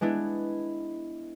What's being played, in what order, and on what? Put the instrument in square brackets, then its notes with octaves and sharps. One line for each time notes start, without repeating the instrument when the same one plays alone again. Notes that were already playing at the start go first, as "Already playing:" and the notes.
[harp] G#3 B3 D4 E4